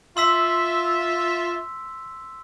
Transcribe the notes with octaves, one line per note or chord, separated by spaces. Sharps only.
F4 E5 C6 E6 B6